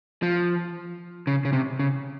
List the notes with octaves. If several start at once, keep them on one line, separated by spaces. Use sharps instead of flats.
F3
C#3
C#3
C3
C#3